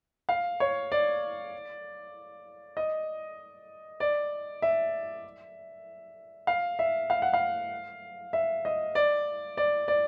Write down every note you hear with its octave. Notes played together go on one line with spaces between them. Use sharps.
F5
C#5
D5
D#5
D5
E5
F5
E5
F5
F#5
F5
E5
D#5
D5
D5
D5